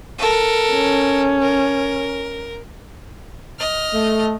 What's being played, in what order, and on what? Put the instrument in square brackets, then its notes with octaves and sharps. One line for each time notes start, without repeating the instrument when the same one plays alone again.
[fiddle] A4 A#4
[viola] C#4
[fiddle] A#4
D#5 F6
[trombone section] A3